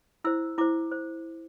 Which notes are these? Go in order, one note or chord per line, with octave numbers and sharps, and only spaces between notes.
E4 C5 E6
E4 C5 D6
C5